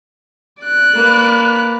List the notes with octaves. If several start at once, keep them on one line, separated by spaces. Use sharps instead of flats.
D5 F#6
A#3 B4